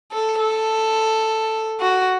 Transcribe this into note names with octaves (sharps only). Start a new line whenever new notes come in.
A4
A4
F#4